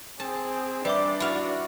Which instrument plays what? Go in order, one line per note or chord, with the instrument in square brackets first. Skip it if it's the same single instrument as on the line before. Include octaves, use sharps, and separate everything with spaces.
[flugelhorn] C4 [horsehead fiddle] G#4 [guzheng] A5
[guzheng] G3 [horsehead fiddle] D4 D5 [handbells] B4 E5 D6
[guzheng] E4 F5 [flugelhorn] F#4